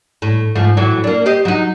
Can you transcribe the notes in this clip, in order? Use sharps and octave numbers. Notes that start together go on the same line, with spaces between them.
A2
G#2 F3 A3
A2 E3 F#3
A#3 D4
G4 C5 D#5
F#3 D#4